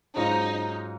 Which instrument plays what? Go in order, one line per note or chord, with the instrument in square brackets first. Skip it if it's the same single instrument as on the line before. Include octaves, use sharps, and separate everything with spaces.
[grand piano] G#2 F#3 C#4 F4 C5 [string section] D#4